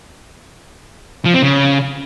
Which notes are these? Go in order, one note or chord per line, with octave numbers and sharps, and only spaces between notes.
F3
C4
C#3